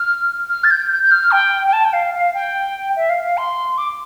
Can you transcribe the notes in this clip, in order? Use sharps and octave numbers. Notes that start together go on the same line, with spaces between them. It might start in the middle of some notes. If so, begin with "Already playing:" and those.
Already playing: F6
F6
A6
G6
G6
G6
F6
G5
G5
A5
G5
F5
F5
G5
E5
F5
F5
C6
D6